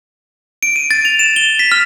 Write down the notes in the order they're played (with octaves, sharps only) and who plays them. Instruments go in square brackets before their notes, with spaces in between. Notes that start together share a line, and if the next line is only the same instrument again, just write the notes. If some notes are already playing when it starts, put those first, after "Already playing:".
[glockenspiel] D7
D#7
A6
F7
E7
G7
B6
F6